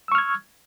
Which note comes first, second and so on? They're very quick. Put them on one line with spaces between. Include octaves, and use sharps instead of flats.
E6 C#6 F6 G#6